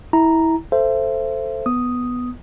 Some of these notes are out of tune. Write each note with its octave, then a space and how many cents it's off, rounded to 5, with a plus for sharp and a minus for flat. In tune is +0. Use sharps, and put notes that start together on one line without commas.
E4 -20 A#5 +0
A4 +5 C5 +0 E5 +35
B3 +0 D#6 +0